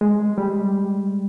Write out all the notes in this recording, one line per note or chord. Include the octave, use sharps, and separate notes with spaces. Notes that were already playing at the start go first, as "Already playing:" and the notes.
G#3
G3